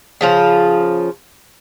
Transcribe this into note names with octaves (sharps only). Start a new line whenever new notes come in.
C#3 F3 F4